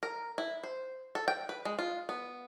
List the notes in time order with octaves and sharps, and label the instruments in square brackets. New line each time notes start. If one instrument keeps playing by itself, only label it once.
[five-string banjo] A#4
E4
C5
A4
G5
B4
G#3
F4
B3